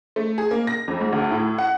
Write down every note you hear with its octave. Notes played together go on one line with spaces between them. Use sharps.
A3
G#4
A#3
A#6
F2
G#2
D2
A2
F#5